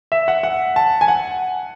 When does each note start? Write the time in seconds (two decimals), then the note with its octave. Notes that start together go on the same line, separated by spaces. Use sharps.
0.12 E5
0.28 F#5
0.43 F#5
0.76 A5
1.01 G#5
1.08 F#5